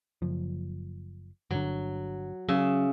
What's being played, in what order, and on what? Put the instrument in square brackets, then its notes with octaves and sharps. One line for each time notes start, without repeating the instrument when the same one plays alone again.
[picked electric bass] F#1 F3
[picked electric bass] G1 D3 [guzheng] F#3
[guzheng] C#3 E5 [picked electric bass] F#3